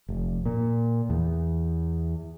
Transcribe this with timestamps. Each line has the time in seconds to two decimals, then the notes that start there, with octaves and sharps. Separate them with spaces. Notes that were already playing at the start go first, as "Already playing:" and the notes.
0.08 F1
0.45 A#2
1.10 E2